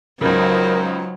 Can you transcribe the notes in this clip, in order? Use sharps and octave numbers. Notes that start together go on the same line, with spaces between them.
C#2 C#3 F#3 D#4 A#4 C5